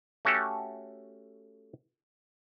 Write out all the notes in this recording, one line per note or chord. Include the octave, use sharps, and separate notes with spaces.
A3 C#4 F#4 G4 A4